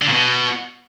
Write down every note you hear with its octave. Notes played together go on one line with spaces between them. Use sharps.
D3
A#2
B2